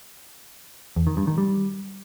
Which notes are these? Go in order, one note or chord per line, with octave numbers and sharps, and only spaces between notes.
E2
D#3
G2
D#3
G3